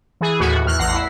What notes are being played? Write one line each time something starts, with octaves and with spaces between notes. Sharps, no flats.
E3 G#4
D#2 A2 F#4
E2 F6 F#6
A1 E2 F#5 A#6 C7
E4